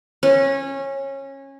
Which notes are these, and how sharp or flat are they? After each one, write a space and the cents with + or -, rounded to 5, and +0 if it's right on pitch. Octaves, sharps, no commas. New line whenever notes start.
C#4 -20